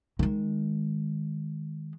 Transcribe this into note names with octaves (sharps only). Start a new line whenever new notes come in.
D#3 G#3